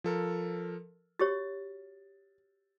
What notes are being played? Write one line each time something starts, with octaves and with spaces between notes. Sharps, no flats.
F3 A4 A#4
F#4 G4 C#5 A6